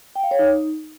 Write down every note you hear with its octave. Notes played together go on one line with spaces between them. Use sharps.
G5
F5
C#5
D#4